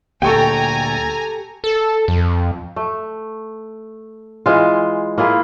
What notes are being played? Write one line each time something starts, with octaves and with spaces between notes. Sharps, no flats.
D2 A#2 G4 A4 G5 G#5 A#5 C#6
A4
F2
A3
E3 G#3 F4
A#3 E4 F4 G#4